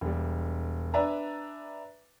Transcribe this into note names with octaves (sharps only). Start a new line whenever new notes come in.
E1 G3
D4 B4 D5 E5 G#5 A#5